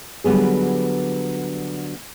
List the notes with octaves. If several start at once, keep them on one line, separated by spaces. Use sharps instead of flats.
D3 F#3 G3 B3 G#4